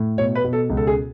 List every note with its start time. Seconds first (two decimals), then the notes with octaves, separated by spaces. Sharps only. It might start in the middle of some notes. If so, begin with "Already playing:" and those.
Already playing: A2
0.18 B2 C#5
0.35 B4
0.44 B2
0.53 A4
0.70 C#2
0.77 A4
0.87 G#4